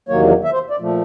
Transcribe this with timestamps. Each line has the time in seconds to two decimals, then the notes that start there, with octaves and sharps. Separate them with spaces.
0.08 E2 C3 D#3 F#3 A#3 C#5
0.44 E5
0.53 C5
0.70 D5
0.79 A#2 F3 A3